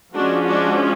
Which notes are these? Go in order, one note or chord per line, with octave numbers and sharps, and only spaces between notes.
F3 G#3 C#4 D4 F#4
D4 F#4